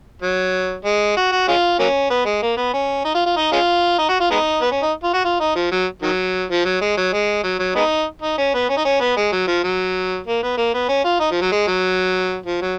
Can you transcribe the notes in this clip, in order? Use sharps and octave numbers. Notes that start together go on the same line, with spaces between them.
F#3
G#3
F#4
F#4
G#3 C#4 F4
F#3 A#3 C#4
B3
G#3
A#3
B3
C#4
D#4
F4
F4
D#4
G#3 C#4 F4
D#4
F#4
F4
G#3 B3 D#4
B3
C#4
D#4
F4
F#4
F4
D#4
F3
F#3
D#3 F#3
F3
F#3
G#3
F#3
G#3
F#3
F#3
G#3 B3 D#4
D#4
C#4
B3
C#4
D#4
C#4
B3
G#3
F#3
F3
F#3
A#3
B3
A#3
B3
C#4
F4
D#4
F3
F#3
G#3
F#3
F3
F#3